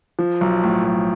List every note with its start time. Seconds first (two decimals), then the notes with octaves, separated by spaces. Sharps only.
0.19 F3
0.41 B1
0.63 A2
0.85 B1